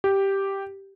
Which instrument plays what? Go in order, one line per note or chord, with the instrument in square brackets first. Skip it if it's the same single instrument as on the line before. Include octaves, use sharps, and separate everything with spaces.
[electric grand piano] G4